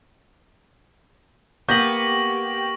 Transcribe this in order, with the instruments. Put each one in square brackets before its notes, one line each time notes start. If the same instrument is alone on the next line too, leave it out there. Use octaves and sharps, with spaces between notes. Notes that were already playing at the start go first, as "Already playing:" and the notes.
[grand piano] A#3 G6 [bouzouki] B3 [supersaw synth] G4 [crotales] C#6 A#6 F#7